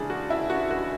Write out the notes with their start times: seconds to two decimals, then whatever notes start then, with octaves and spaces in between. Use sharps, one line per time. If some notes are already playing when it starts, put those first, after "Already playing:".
Already playing: C#3 E3 G#3 D4 G#4
0.10 F#4
0.30 E4
0.50 F#4
0.71 F#4